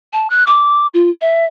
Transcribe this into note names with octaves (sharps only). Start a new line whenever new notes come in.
A5
F#6
D6
F4
E5